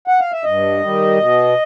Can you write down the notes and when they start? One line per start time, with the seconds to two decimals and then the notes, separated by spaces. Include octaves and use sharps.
0.08 F#5
0.20 F5
0.32 E5
0.44 G2 D#5
0.81 D#3 G3
1.17 B2